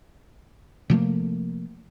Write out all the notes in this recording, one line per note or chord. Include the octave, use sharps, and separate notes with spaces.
C3 F3 A3 A#3